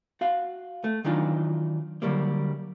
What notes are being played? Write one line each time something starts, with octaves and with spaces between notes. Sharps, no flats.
F#4 F5
A3
D#3 E3 F#3 D4 D#4 F4
D3 F#3 G3 A#3